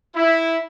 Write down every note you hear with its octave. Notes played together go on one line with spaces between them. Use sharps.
E4